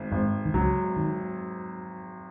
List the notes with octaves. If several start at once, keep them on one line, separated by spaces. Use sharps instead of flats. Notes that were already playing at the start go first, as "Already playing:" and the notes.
Already playing: G#1
G#1 G#2
D#3
C#2 C#3 F#3
D#3